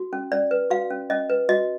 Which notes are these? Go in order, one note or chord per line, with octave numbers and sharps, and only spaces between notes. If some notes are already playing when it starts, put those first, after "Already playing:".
Already playing: F#4
C#4
C#4 D5
B4
F#4 F5
C#4
C#4 D#5
B4
F#4 D#5